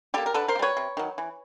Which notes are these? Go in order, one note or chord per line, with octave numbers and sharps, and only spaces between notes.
G3 A#3 G4 A4
A#4
D3 A4 B4
A#4 C5
A#3
G3 B4 C#5
C3
D#3 F#3
E3